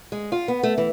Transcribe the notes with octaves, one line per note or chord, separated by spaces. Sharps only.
G#3
F4
B3
A3
E3